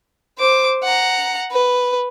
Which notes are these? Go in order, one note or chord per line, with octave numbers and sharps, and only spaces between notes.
C5 D6
F#5 A#5
B4